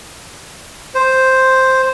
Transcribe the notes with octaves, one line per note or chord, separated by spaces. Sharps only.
C5